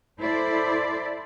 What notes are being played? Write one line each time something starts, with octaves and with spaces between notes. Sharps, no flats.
E4 A4 C5 D5